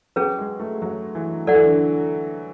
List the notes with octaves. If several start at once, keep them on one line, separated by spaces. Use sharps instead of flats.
F#3 C#4 G#4 B4
G#3
A3
F#3
E3
F#3 A4 D5 F#5
E3
D3